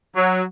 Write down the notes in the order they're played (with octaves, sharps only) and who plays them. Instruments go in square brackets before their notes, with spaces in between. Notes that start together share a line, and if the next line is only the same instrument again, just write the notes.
[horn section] F#3